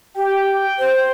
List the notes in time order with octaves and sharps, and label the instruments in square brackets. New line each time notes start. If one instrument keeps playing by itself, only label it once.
[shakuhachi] G4 [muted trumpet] G5
[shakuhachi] C5